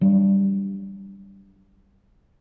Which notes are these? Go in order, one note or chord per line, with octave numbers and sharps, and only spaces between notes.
F#3 G3 D4